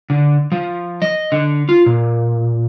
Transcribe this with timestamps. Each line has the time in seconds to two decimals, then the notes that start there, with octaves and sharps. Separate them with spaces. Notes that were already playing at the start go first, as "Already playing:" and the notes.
0.10 D3
0.52 F3
1.02 D#5
1.32 D3
1.69 F4
1.86 A#2